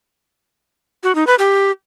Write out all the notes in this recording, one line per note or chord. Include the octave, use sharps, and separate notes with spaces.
F#4
D#4
B4
G4